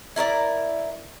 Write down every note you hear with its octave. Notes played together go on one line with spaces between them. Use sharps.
E4 A#4 C#5 D5